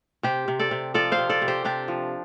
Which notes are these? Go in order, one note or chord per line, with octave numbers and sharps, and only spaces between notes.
C3 G4 C5
C3
A4 D5
C3
F3 A4 D5
C5 F5
C3
A4 D5
C3
G4 C5
C3 D4 G4
F3